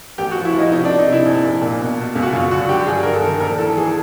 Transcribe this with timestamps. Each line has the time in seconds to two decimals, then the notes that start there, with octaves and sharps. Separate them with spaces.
0.18 A1 G4
0.31 F#4
0.35 F3
0.45 E4
0.54 F3 D#4
0.72 C3 D#4
0.85 D4
0.90 C3
0.99 D#4
1.08 C3 E4
1.26 A#1
1.44 A#1
1.61 A#2
1.80 B2
1.98 B2
2.15 C#2
2.22 F#4
2.33 F#2 F4
2.51 D3 F#4
2.69 D3 G4
2.87 G2 G#4
3.03 G2 A#4
3.14 A4
3.23 D#3
3.40 A#1 A#4
3.58 E3 A4
3.77 E3 G#4